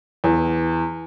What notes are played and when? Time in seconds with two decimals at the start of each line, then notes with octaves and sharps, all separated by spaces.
0.24 E2